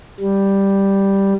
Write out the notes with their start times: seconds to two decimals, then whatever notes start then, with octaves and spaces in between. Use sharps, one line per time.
0.20 G3